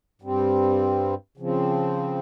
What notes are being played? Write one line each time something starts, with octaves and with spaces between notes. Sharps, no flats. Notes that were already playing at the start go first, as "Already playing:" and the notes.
G2 G3 C4
C#3 F3 C4